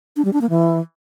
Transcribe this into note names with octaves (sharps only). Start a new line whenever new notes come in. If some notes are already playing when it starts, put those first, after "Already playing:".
D4
G3
D4
A#3
E3